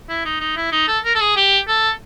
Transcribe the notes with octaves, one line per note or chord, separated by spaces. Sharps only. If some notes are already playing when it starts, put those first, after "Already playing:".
E4
D#4
D#4
E4
D#4
A4
A#4
A4
G#4
G4
A4